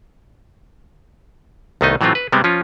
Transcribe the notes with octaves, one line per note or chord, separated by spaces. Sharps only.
C2 D#3 A3 B3 D#4 D#5
A2 E3 F#3 A3 C4 F4
B4
C3 G3 G#3 B3 C4
F3 C#4 F4